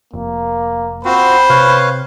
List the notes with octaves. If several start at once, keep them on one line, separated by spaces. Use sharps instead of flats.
F1 A#3
C4 F4 F#4 C5 B5
C3 B4 C#5 F5